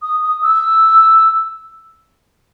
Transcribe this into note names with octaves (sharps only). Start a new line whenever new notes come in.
D#6
D#6
E6